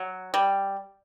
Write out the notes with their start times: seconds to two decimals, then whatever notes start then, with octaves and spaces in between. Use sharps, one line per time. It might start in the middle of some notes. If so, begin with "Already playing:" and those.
Already playing: F#3
0.34 G3